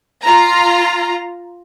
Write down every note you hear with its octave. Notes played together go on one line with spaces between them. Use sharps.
F4 A#5